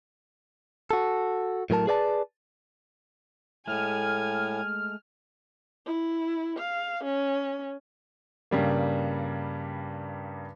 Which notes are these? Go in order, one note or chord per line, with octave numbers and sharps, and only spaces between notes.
F#4 A4
A2 F#3 A#4 A5
G#4 B4 D5 F5 A5
A2 G#3 A3 G#5 F6
E4
F5
C#4
G2 C#3 G3 A#3